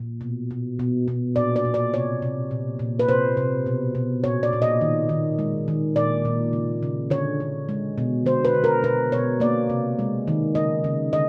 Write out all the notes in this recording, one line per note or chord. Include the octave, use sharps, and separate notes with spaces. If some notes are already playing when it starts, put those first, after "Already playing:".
Already playing: A#2
B2
B2
B2
B2
A#2 D5
D5
A#2
D5
C3 C#5
C3
A#2
A#2
B4
C3 C5
C3
B2
B2
A#2 C#5
D5
A#2
D#5
D#3
D#3
G#3
D#3
A#2 D5
A#2
C#3
C#3
D3 C#5
D3
G#3
B2
D3 C5
B4
D3
A#4
B2 B4
B2 C#5
A#3 D5
C3
G#3
D#3
C#3 D#5
C#3
D3 D#5